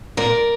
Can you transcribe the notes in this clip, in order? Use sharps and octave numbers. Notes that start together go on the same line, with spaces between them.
A#2 A#4 D5